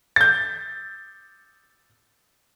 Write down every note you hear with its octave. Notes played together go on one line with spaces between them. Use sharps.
G6 A6